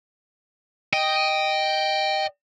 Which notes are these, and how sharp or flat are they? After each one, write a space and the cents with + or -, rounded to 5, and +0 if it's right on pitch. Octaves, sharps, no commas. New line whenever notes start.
D#5 -5 G5 +0